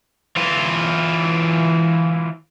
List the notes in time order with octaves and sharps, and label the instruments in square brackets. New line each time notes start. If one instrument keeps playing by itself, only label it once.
[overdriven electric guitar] E3 F4